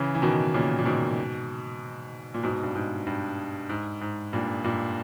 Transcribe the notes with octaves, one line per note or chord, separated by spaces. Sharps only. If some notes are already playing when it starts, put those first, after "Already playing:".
Already playing: C#3 E3
E3
B2 D#3
A#2 C#3
A#2
G#2 B2
A#2
G#2 B2
G2
G#2
G2
G#2
G#2
G2 A#2
G2 A#2